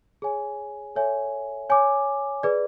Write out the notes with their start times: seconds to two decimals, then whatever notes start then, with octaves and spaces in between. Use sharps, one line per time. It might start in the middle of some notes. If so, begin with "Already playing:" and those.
0.22 G#4 C#5 G#5
0.96 A4 C#5 E5 G#5
1.70 C#5 G#5 D6
2.43 G#4 B4 D5